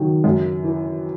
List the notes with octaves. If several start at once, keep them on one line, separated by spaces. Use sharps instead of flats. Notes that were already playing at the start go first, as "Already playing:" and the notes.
Already playing: D#3 F#3
F#2
E3